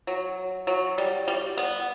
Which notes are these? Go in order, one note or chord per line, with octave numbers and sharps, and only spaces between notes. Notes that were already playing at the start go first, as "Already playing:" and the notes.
F#3
F#3
G3
G3
B3